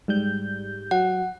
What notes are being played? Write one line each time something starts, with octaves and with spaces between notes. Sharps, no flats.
G#2 G3 G6
F#3 F#5